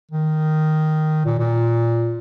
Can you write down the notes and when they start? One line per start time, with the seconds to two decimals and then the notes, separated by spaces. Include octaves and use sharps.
0.11 D#3
1.26 A#2
1.39 A#2